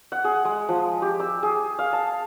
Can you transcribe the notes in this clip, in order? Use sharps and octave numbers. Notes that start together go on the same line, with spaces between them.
F#5
G#4
G#3
F3
G4
E6
G#4
F5
A5